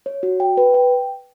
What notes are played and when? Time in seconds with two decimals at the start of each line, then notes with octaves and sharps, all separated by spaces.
0.06 C#5
0.23 F#4
0.40 G5
0.57 B4
0.74 G5